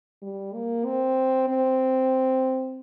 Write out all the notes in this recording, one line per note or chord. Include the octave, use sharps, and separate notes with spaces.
G3
A#3
C4
C4